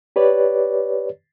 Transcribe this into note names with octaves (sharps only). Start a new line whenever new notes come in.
G4 B4 C#5 D5